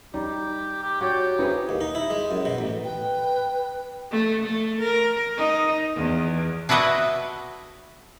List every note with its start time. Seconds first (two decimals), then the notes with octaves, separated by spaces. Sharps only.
0.14 G3 D#4 G4
0.83 G4
1.01 F#4 G4 C#5 D5
1.39 B3 D#4 E4 G#4 B4 C5
1.69 D#2
1.81 D#4
1.95 E4
2.10 G#3
2.31 F#2
2.45 B2
2.58 A1
2.84 B4 G5
4.11 A3
4.44 A3
4.81 A#4
5.37 D#4
5.95 E2
6.69 D4 E4 F#4 B4 D#5 E5